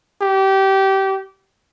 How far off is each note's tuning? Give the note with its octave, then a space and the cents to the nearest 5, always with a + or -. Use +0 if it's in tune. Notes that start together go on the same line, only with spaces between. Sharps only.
G4 -25